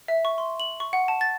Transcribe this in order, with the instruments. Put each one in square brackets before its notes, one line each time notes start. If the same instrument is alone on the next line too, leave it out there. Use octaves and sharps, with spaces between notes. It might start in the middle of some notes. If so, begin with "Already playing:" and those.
[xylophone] E5
C#6
C6
F#7
C#6
F#5
A5
A6